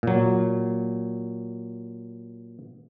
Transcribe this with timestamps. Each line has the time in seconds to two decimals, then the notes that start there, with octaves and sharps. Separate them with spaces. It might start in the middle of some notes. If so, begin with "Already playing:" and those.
0.03 A#2 F#3